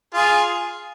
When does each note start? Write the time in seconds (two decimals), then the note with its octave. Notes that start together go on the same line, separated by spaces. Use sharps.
0.14 F4 G#4